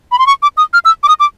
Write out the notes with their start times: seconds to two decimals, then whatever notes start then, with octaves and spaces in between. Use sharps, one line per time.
0.12 B5
0.19 C6
0.27 C#6
0.43 D6
0.57 D#6
0.73 F6
0.85 E6
1.03 D6
1.08 D#6
1.20 D6